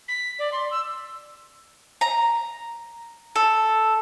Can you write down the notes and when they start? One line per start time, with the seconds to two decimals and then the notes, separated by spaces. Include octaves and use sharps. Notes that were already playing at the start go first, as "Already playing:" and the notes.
0.08 B6
0.39 D5
0.52 C6
0.71 E6
2.01 A#5
3.36 A4